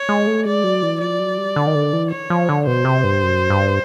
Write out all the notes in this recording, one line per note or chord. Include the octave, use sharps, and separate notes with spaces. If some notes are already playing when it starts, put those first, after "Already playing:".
Already playing: C#5
G#3
A3
G#3 D5
F#3
E3
F3 D5
F#3
G3
D3
D#3
D3
E3
C#5
F3
D3
B2 C5
C3
G2
F#2
G2